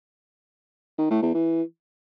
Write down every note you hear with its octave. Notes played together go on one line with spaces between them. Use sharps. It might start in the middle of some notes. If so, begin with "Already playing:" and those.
D#3
A2
E2
E3